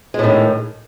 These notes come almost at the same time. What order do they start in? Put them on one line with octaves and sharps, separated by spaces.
G#3 A2 D#3